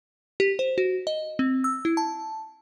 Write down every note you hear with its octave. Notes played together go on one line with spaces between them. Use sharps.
G4
C5
F#4
D#5
C4
E6
E4
A5